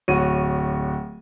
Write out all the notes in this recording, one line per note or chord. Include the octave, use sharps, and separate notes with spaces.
D1 F#4 C#5 D#7